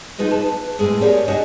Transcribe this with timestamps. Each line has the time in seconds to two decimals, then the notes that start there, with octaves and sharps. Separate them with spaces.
0.18 D#4 F4 G#4 B4 D#5
0.31 B4 A5
0.79 A2 G#3 G#4
1.01 G4 A#4 C#5 D5 F5 G#5
1.28 C#4 D4 F#4 G4 C#5 D#5